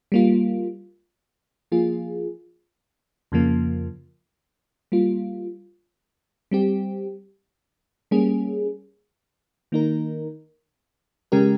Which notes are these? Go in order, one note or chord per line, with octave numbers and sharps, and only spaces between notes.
G3 A#3 F4
F3 A#3 F4 G#4
F2 C#3 F3 A#3
G3 A#3 F4
G3 C4 G4
G3 A#3 C#4 G#4
D#3 A#3 D#4 A#4
C#3 G#3 C#4 G4 A#4